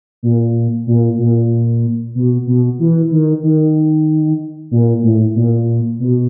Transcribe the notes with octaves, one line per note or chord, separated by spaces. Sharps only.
A#2
A#2
A#2
B2
B2
E3
D#3
D#3
A#2
A2
A#2
B2